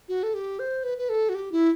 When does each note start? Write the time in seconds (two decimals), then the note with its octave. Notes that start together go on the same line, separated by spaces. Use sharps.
0.09 F#4
0.23 A4
0.34 G4
0.59 C5
0.84 B4
0.98 B4
1.09 A4
1.29 F#4
1.35 G4
1.52 E4